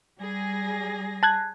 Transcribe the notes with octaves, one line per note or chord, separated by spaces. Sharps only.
G3 G#4 A#6
A5 F#6 G#6